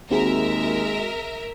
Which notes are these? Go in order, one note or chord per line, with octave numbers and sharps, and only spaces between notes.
D#2 G#3 C4 F#4 G#4 A#4 E5